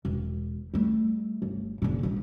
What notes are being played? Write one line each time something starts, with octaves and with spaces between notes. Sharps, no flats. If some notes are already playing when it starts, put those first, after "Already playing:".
E1
G3 A3
G1
F#1 A#2
G#2 G3